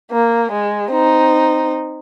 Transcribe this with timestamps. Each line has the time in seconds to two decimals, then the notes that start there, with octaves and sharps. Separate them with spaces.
0.11 A#3
0.52 G#3
0.92 C4 D#4